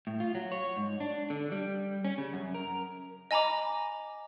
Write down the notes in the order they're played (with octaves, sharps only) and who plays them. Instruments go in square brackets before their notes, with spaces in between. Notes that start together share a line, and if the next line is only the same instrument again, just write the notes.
[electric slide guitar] A2
F4
F#3
C#5
G#2
D4
D3
G3
C#4
C#3
F#2
A#4
[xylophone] D#5 G#5 A#5 B5 D6